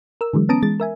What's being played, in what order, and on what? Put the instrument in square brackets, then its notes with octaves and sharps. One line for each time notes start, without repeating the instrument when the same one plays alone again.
[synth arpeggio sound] A#4 E6
D3 E3 F#3 G#3
B3 C#4 A5 A#5 D#6 D7
E3 G#3 A6
A#4 E5 G#5